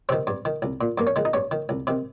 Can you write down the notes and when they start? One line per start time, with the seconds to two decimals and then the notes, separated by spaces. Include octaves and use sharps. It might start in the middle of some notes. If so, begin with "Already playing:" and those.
0.09 C3 D#3 C4
0.27 G2
0.45 D#3
0.62 C2
0.81 A#2
0.98 G2 A#3
1.07 C#4
1.16 D#3 G#3
1.25 D#4
1.33 G2 C#4
1.51 D#3
1.69 C2
1.87 C3 D#3